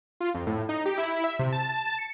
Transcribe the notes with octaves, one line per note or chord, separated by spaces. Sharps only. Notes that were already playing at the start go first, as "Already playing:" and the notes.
F4
F2
A2
D#4
G4
E4
E5
C3
A5
A5
A5
C#7